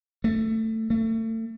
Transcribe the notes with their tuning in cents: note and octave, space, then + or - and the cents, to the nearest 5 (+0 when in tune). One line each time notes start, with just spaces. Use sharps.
A3 +15
A3 +35